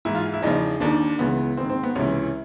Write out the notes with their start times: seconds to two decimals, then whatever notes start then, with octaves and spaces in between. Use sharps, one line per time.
0.05 G#2 E3 E4
0.15 F4
0.33 E4
0.42 E2 C#3 F3 D#4
0.80 D#2 D#3 D4
1.19 C#2 C#3 E3 B3
1.57 G#2 D#3 C4
1.70 C4
1.83 B3
1.95 C#2 C3 E3 C#4